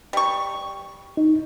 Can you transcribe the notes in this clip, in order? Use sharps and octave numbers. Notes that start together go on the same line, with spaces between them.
G3 C#6
D#4